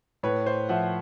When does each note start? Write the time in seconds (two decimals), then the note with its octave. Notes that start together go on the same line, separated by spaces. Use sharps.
0.23 A2 B4 C#5
0.46 C5
0.69 F3 E5 F#5